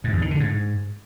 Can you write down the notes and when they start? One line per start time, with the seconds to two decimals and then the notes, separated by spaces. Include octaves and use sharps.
0.04 G#2
0.13 E2
0.22 D#3
0.31 D3
0.40 G#2